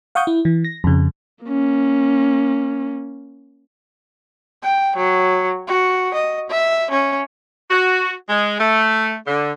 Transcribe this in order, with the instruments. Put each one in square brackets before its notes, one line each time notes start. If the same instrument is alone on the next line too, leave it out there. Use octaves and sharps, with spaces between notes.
[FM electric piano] F5 F#5 C#6 D#6 G6
E4
E3
A#6
F2 C#3
[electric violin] A#3 C#4
[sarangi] G5
F#3
F#4
D#5
E5
C#4
[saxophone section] F#4
G#3
A3
D3